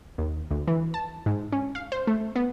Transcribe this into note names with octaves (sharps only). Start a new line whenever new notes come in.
D#2
D2
E3
A5
G#2
C#4
F5
C5
A3
B3